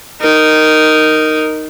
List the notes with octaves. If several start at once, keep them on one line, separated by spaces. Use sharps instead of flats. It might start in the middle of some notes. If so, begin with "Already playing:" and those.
D#4 A#4